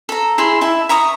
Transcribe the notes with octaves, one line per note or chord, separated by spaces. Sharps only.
A4 A#5
E4 G#4 E5 C6
E4 E5 A5
E5 A#5 C#6 D#6